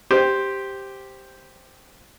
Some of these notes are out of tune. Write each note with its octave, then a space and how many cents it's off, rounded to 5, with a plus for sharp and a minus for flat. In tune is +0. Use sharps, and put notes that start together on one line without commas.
G4 +0 C5 +0